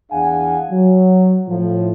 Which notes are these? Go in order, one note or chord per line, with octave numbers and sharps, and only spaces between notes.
E2 D4 G#4 F5 F#5 G#5
F#3
A2 F3